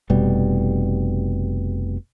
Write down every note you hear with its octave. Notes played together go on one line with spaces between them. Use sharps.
F1 B2 G3